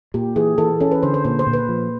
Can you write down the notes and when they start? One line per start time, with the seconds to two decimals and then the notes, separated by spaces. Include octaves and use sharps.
0.14 A#2 G4
0.36 E3 G#4
0.58 E3 A4
0.81 C#4 A4
0.91 B4
1.03 D3 C5
1.14 C5
1.25 A#2 C5
1.39 C5
1.47 A#2
1.53 B4
1.69 F3